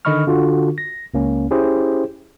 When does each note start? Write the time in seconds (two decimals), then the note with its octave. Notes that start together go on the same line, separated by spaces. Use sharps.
0.05 D3 D#3 D#5 B5 C#6 F6
0.27 D3 F4 F#4
0.78 A#6
1.14 C#2 A#3 C#4
1.51 C#4 E4 G4 G#4 C5